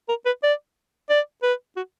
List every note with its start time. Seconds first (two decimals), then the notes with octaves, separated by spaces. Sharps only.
0.09 A#4
0.26 B4
0.43 D5
1.10 D5
1.43 B4
1.76 F#4